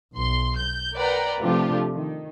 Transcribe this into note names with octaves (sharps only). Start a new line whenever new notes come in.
B1 C6
G6
A#4 B4 D5 F#5 G5 A#5
C3 F3 A3 D4 F4 G4
D#3